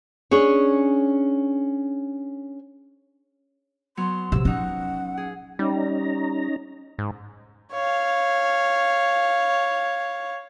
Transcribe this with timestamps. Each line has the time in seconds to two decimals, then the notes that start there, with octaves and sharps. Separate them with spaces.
0.31 C#4 D4 G#4 C#5
3.97 F#3 B3 C6
4.32 C3 F3 E6
4.45 C#4 D#4 F#4 F#5
5.17 G#4
5.59 G3 C#4 D#4 A#5
6.99 G#2
7.73 C#5 F5